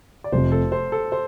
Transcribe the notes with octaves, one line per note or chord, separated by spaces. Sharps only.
D5
F1 F2 C3 C5
A4
C5
A4
C5